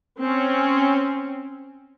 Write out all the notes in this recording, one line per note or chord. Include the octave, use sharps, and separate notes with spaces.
C4 C#4